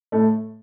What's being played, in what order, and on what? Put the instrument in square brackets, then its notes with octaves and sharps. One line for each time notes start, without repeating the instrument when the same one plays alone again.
[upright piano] A2 A3